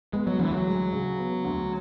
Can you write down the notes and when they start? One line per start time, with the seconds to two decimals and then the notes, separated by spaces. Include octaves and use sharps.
0.13 G#3 B3
0.27 F#3
0.39 D2 E3
0.52 F#3
0.66 G#3
0.93 C#3
1.19 B3
1.45 D2